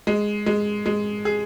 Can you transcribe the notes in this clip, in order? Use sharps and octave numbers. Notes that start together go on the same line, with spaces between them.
G#3
G#3
G#3
G#4